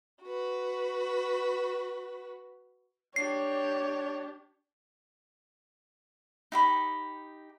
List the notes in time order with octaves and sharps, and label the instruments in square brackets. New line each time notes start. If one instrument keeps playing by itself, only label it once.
[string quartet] F#4 B4
[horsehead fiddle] D4 G4 [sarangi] C#5 [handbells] C7
[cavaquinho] D#4 G4 B5